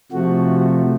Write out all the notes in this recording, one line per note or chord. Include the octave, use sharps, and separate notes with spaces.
C3 F3 A3 F#4